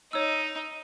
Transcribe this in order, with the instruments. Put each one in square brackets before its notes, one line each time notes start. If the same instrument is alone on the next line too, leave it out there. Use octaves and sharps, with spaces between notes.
[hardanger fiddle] D#4 [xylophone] C#5 E6